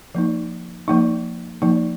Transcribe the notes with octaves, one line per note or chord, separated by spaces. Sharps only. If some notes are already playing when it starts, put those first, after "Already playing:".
F3 A#3 D#4
F3 A#3 D#4
F3 A#3 D#4